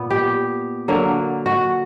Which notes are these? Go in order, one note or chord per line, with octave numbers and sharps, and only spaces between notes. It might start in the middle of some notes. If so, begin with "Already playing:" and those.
Already playing: A#2 B3
G4
D3 F#3 A#3
F#4